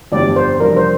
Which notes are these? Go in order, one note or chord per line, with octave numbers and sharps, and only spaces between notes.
G1 F2 F3 D4 G4 D5
C5
F2 C3 G3 D4 A#4
C5